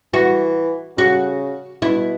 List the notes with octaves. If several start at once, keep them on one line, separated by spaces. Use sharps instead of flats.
E3 F#4
C#3 F#4
B2 E4